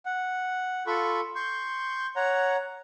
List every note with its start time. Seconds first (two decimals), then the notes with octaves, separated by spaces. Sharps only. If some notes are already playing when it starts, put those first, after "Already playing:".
0.06 F#5
0.87 F4 A4 B5 C#6
1.36 C6 C#6 G6
2.16 C#5 F#5 A#5